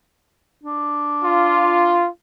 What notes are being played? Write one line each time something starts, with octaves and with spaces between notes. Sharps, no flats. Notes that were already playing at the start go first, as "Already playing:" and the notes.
D4
F4